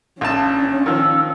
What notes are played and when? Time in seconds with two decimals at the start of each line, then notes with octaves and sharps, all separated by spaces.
0.21 A#1 C#4 D4 A5
0.86 D#3 F3 E6